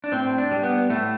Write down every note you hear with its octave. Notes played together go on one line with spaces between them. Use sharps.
D4
A2 C4
D4
G3
B3
A2 A3